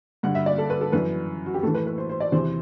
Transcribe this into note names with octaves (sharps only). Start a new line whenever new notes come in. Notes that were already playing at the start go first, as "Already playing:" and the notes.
G2 D3 F#5
E5
D5
A4
B4
A4
F#2 E3 B4
F#4
G4
A2 E3 A4
B4
B4
C5
C5
D5
E2 C3 E3 C5